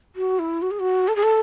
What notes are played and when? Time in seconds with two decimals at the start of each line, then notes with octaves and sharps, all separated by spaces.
0.15 F#4
0.39 E4
0.62 F#4
0.71 G#4
0.79 F#4
1.08 A4
1.16 G#4
1.23 A4